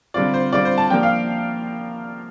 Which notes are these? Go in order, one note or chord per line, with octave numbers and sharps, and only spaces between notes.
D3 G3 C4 F4 D5
C5
D3 G3 C4 F4 D5
C5
A5
F3 A#3 D4 G4 A#4 G5
F5